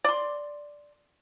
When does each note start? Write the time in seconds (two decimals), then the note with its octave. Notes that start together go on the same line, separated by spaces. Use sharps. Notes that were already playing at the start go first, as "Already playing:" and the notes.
0.04 D5 C6